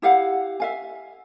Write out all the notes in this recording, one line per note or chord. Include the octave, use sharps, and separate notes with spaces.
E4 G4 F5 F#5
E5 F5 G#5